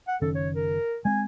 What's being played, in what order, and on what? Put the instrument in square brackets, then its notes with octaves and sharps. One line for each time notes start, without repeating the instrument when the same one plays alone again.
[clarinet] F#5
[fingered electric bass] F#1 D#3 C#4 [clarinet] A4
[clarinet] C#5
A#4
[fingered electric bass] G#3 C4 [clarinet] G#5